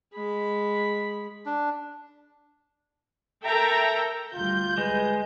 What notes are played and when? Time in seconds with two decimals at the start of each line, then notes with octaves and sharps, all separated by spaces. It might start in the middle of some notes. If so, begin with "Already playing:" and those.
0.15 G#3 B5
1.46 D4
3.45 A4 A#4 E5 G5 A5 A#5
4.33 D2 G3 F4 G6
4.78 G#3 B4